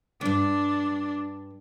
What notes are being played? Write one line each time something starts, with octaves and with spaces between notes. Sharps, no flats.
D2 G2 D4